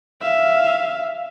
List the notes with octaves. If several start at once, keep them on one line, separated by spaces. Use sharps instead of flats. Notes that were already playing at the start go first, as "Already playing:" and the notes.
E5 F5